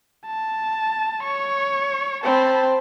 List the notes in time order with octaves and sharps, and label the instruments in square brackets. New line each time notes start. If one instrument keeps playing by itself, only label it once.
[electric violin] A5
C#5 C#6
[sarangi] C4 [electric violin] A5 B5